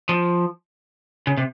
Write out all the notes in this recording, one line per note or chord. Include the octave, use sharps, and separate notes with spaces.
F3
C#3
C3